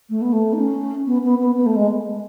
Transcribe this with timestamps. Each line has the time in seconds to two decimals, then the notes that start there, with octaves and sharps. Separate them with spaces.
0.09 A3
0.21 B3
0.32 A3
0.53 D#4
0.59 C#4
1.06 B3
1.23 B3
1.39 B3
1.56 B3
1.66 A3
1.75 G#3